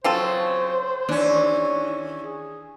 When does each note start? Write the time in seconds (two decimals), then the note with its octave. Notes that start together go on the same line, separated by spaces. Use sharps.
0.04 C#3 F#3 C4 F4 A4 C5
1.09 D#2 E3 C#4 D4
2.23 G#4